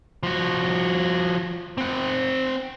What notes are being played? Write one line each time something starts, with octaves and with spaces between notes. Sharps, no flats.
F3 F#4
C4 F#5